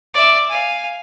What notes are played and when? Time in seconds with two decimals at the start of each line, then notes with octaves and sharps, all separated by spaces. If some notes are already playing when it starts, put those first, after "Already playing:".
0.14 D5 E5
0.49 F5 G#5